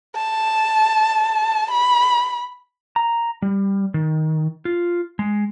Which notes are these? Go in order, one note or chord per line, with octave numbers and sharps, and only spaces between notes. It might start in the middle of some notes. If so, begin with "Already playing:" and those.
A5
B5
A#5
G3
D#3
F4
G#3